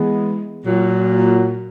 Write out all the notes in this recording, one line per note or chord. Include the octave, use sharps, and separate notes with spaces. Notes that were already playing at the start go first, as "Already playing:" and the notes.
Already playing: E3 G#3 B3
A#2 F#3 A#3